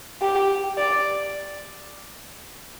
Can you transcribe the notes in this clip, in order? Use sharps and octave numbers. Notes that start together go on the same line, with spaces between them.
G4
D5